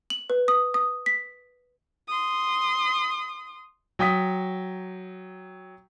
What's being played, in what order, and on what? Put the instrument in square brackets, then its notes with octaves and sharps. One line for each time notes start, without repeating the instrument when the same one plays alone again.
[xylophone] F#7
B4
D#6
D#6
B6
[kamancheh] C6 D#6
[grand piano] F#3 G5 D#6 B6